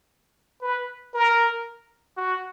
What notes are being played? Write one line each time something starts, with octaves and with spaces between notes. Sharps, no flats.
B4
A#4
F#4